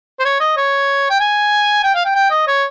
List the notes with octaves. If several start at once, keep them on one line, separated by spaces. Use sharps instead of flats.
C5
C#5
D#5
C#5
G5
G#5
G5
F5
G5
G5
D#5
C#5